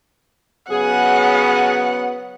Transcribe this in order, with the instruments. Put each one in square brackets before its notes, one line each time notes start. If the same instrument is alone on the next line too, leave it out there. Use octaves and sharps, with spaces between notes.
[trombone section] C#3 F#3 B3 [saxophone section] G#4 [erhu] F#5